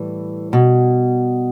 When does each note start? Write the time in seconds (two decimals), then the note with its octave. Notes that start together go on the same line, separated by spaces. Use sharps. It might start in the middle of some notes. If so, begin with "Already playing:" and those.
Already playing: A2 E3 G3
0.53 B2